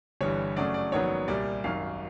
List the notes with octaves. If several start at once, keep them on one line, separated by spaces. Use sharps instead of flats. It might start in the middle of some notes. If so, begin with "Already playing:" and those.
G1 G2 E3 G3 C#5
F#2 C#3 F#3 A3 D5
D5
A#1 G#2 D#3 F#3 B3 C#5
C2 A#2 G3 D5
G#1 F#2 D#3 F5